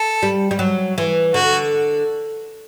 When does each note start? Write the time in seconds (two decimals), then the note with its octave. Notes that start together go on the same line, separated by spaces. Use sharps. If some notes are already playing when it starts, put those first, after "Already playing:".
Already playing: A4
0.22 G3
0.51 G3
0.59 F#3
0.98 E3
1.34 D3 F#4